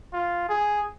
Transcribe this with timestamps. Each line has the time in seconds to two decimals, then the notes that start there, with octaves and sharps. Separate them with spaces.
0.13 F4
0.49 G#4